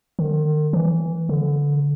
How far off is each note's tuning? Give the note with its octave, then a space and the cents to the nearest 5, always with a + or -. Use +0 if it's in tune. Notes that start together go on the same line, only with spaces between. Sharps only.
D#3 -40
E3 +0
D3 -20